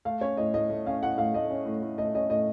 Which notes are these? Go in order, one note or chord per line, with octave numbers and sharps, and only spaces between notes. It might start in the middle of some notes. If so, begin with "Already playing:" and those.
A3 F5
C#4 C#5
A2 D#5
A2 D#5
A3
C#4 F5
A2 F#5
A2 F5
A3 D#5
C#4
A2
A2
A3 D#5
C#4 D#5
A2 D#5